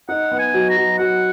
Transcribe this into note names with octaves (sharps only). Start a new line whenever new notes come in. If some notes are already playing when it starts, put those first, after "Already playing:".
D#4 F#5
B3
G#5
F#3
A#5
F#3
F#3 F#5